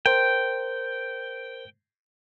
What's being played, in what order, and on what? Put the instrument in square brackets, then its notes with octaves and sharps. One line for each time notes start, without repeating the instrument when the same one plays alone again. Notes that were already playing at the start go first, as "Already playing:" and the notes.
[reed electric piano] A#4 C5 [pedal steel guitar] G5